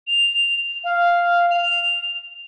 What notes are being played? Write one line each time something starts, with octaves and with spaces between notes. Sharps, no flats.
F7
F5
F7